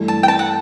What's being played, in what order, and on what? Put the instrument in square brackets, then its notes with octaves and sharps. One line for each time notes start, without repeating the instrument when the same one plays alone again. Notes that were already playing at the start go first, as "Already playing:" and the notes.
Already playing: [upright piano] G2 E3 A3 E4
[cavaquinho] A5
G5
A5
F#5